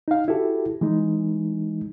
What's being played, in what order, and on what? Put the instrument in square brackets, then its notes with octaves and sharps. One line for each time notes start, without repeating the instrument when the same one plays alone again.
[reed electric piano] D#4 F5
E4 F#4 G4 A4
E3 G#3 D#4